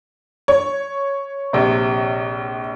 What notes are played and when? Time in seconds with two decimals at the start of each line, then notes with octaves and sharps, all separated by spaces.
0.48 C#5
1.53 A#1 C3